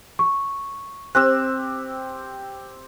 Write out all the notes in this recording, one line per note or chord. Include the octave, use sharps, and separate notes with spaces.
C#6
C4 G4 E6 F#6